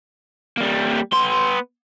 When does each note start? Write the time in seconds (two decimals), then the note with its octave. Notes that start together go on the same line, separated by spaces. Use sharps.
0.57 G3 A#3
1.13 B3 C6